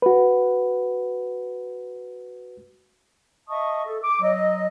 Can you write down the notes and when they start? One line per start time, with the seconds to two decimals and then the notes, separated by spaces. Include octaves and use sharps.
0.02 F#4 B4
3.48 D#5 E5 A5 C#6 D#6
3.87 A4
4.02 D6
4.21 F#3 D#5